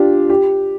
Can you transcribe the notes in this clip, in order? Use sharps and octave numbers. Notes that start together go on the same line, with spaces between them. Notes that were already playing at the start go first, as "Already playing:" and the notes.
Already playing: D4 F4 G4
G4